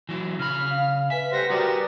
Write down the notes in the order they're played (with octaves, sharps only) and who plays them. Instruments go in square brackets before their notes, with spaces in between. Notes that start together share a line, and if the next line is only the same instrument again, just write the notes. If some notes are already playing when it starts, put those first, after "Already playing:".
[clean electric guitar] E3 F#3 E4
[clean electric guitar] C#3 B5 [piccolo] F6
[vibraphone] F5
[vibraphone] B4 G#5 [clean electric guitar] E5 [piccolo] B6
[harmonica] G3 C5 F#5 [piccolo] A#6
[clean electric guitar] G3 F#4 [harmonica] G4 A#4 D5 [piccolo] D#6